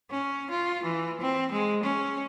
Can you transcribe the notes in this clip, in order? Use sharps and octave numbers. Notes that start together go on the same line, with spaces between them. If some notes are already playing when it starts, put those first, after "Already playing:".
C#4
F4
E3
C4
G#3
C#4